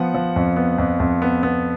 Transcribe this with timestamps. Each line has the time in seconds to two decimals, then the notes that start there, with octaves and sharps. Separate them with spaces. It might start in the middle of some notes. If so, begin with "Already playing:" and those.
Already playing: F3 B3 F#5
0.14 F3
0.36 F2
0.56 B3
0.78 F2
1.00 F2
1.22 B3
1.43 B3